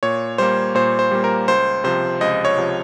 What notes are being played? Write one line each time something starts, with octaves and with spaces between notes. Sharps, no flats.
A#2 C#5
G3 A#3 C5
A#2 C5
C5
G3 A#3
A#4
C#2 C5
C3 F3 C5
C#2 D#5
C#5
C3 F3